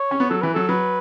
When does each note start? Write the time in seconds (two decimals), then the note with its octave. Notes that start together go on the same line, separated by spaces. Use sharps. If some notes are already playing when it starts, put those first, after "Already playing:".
Already playing: C#5
0.11 C#4
0.20 B3
0.30 F#3 A4
0.42 E3 B4
0.54 F#3 A4
0.69 F#3 B4